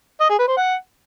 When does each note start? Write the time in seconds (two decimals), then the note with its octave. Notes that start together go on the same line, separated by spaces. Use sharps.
0.20 D#5
0.29 G#4
0.39 B4
0.48 C5
0.57 F#5